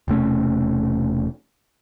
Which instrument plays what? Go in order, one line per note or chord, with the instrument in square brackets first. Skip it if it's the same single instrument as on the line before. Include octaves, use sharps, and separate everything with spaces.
[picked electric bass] E1 C3 A3 C#4